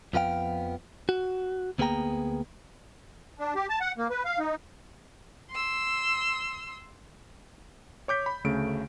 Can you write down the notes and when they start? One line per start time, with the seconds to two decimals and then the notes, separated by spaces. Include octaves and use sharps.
0.13 F2 F3 B3 F5 G5
1.09 F#4
1.79 D2 A#3 B3 G#4 G5 A#5
3.39 D4
3.55 G4
3.69 A5
3.81 F#5
3.98 A#3
4.10 B4
4.25 F5
4.39 D#4
5.51 C6 E6
8.08 C#5 D6 G6 B6
8.26 B5
8.44 D2 C#3 A3 D7